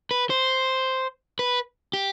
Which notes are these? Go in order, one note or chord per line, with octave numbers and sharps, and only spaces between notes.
B4
C5
B4
G4